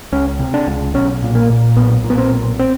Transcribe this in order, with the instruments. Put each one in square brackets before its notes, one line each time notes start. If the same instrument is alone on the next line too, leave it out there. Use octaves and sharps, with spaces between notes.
[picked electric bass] C#2 C#4
C3
D4
C#2
B1 C#4
A#2
A#3
A#2
B1 B3
A#2
B3
C4
B1
C4